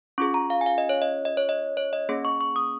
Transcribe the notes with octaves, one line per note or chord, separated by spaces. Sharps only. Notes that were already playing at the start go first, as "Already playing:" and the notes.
C#4 F4 G#4 C#6
A#5
F5
G#5
F5
D#5
C#5
D#5
D#5
C#5
D#5
C#5
D#5
A#3 C#4 G#4
C#6
C#6
D#6